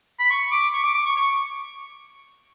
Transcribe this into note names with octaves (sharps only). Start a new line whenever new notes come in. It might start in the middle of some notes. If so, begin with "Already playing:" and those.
B5
C#6
D6
C#6
D6
D6
C#6
C#6